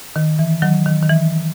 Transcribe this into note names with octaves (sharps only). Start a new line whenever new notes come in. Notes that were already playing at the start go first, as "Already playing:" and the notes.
D#3
E3
D#3 F#3
D#3
D#3
E3